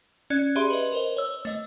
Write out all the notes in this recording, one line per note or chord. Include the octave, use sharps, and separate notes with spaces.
C#4 D5 F#6 G#6
G4 G#4 D5 E5 B5 C6
B4 D#5
A#4 C5 D#5
C#5 E6
A3 D#5